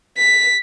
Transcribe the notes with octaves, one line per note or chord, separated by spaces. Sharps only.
B6